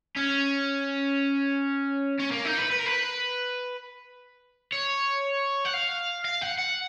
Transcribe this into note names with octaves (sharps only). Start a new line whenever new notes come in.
C#4
C#4
A#3
D#4
B4
B4
A#4
B4
C#5
F#5
F5
F5
F#5
F#5